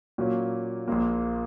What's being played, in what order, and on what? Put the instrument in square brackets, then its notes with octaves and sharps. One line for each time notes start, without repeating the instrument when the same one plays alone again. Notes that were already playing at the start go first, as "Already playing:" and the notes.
[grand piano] A#2 F#3 A#3 C#4
A#1 A#2 A#3